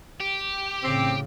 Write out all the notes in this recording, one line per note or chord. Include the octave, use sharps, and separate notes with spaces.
G4
A1 C#3 C4